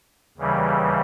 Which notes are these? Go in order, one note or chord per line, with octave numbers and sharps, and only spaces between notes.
D#2 C#3 E3 G3